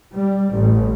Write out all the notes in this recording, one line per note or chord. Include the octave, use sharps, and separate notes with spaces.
G3
A1